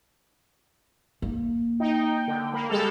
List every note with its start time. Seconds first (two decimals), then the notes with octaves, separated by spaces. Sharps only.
1.22 A#3
1.80 D#4 G5
2.28 D3
2.53 A#3 B5
2.70 G3 G#3 A4 F7